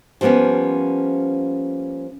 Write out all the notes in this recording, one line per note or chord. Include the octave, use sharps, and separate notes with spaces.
F3 G3 A#3 B3 C#4